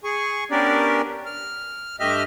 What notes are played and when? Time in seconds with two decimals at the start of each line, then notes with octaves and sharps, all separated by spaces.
0.04 G#4 G#5 C#6
0.51 B3 C#4 D4 G4 A#4 D5
1.26 F6
2.00 G2 A3 G4 D#5 E5 F6